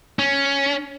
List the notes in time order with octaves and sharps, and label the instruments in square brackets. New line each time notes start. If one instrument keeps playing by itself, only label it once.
[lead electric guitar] C#4